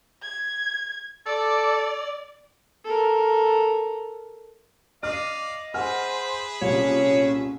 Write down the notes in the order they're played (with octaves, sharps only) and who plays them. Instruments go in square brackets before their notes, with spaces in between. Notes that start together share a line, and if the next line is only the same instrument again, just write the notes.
[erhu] G#6
[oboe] A4 [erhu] D5
[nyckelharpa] A4 A#4
[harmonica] D5 F5 [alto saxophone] D#5 [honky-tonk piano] F6
[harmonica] G#4 B4 E5 [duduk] C5 [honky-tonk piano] F#5 G#5 F6
[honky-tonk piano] C2 A#2 [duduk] C#4 [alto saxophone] C#5